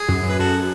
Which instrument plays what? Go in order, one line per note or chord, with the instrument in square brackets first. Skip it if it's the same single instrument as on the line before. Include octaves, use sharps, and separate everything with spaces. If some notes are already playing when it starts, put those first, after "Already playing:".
Already playing: [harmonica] G#4
[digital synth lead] F#2
[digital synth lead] F#2 [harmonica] B4
[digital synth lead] F#2 [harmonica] F#4 A4